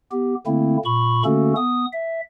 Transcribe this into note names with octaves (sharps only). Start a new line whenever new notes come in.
B3 G4
D3 A3 A#3 C4 E4
A#2 B5 C#6
D3 A3 A#3 C#4 F#4 A4
B3 D#6
E5